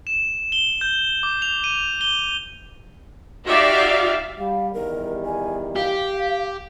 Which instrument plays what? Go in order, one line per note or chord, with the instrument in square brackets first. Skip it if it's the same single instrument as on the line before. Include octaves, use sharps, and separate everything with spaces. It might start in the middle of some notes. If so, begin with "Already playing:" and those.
[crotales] E7
G7
G6
D6
F7
D#7
G7
[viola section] D#4 F#4 G4 D5 E5 F5
[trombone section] G3 [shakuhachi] F5
[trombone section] E2 D#3 G3 [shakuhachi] A#4
[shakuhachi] G#5
[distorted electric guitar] G4 [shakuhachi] F5